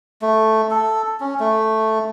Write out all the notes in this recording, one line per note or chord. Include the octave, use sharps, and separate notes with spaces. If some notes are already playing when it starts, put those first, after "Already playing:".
A3
A4
C#4
A3